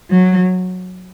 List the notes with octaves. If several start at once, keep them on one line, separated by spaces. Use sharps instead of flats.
F#3